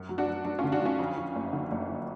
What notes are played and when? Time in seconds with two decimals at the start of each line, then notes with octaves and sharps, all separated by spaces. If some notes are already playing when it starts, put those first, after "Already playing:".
Already playing: F#2
0.09 F#3
0.18 D4 F#4
0.27 F#3
0.45 F#3 D4
0.59 C#4 F4
0.64 D3
0.72 D4 F#4
0.81 F#3 C#4 F4
0.99 F2
1.18 F2
1.35 F#1
1.53 D3
1.71 F#1
1.89 F2